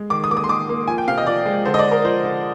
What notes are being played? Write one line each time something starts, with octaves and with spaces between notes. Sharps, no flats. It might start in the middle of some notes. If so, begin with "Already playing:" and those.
Already playing: G#3
D#3 D6
D#6
A#3 D6
D#6
C6
D#3 D6
A#3
F3 G#5
G5
C3 F5
D#5
F3 D5
G#3
D3 C5
D#5
D5
D3
A#4
F3 C5
D3